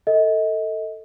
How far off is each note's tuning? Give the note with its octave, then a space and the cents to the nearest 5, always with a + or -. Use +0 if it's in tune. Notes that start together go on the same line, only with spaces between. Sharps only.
A4 +20 D#5 +30